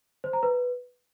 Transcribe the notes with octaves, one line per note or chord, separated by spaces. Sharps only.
C5
A#5
B4